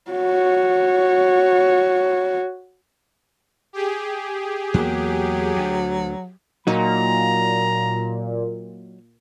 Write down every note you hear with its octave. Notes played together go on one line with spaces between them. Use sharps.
F#4 C#5
G4 G#4
E2 F#3 A#3
D2
A#2 F#3 D#4 A#5